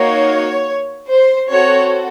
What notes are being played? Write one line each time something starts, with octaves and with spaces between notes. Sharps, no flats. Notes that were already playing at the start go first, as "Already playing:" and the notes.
Already playing: A#3 D#4 F#4 C#5
C5
C4 F#4 A4 C#5